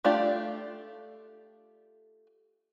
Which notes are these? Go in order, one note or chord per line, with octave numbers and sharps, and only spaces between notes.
A3 D4 F4 G4 D5